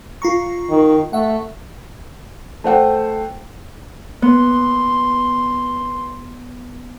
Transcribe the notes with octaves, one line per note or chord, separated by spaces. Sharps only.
F4 A#5 C#6
D#3
A3 E5 F#5
A3 C5 F#5 G5
B3 C6